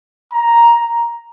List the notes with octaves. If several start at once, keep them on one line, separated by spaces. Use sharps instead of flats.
A#5